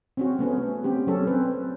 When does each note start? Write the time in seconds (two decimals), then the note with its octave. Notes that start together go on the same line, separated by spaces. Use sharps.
0.17 C4 C#4 F#4
0.39 A3 B3 C#4
0.84 C4 C#4 G4
1.07 F#3 C#4 A4
1.27 C4 B4